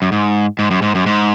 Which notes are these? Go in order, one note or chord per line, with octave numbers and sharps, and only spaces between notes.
F#2
G#2
G#2
F#2
G#2
F#2
G#2